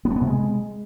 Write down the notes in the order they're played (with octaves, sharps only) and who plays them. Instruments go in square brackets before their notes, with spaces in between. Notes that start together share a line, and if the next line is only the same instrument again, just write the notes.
[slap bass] B3
A3
B3
C3
G#3